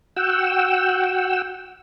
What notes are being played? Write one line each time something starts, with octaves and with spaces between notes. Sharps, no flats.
F#4 F#5 G5 E6